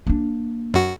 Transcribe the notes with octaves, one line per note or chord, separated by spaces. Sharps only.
A#3 D4
F#2 F#4